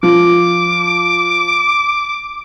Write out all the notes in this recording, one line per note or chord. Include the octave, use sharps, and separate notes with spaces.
F3 D6